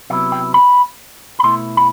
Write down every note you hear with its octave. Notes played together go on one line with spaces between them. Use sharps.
C3 F#3 B3 E4 E5
G5
B5
B5
B2 A3 E4 C6
B5